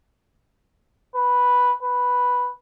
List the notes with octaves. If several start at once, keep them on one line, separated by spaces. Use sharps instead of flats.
B4
B4